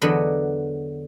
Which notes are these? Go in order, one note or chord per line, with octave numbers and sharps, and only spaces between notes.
E2 D3 F#3 D4 B4 D#5